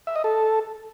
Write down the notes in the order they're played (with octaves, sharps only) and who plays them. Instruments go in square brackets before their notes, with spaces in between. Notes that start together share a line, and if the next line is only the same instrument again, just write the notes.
[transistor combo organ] E5
D#5
A4